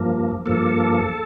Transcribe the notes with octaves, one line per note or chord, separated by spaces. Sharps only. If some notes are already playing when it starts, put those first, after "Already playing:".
Already playing: G2 F3 A#3
G2 F3 A#3 A4